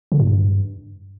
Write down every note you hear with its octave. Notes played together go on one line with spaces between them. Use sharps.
C#3
G#2
G2